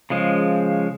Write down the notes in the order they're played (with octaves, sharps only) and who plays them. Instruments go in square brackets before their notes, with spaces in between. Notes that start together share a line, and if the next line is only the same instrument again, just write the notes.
[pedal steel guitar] C#3 F3 G#3